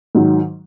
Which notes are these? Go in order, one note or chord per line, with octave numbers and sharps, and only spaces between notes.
G#2 D#3 F#3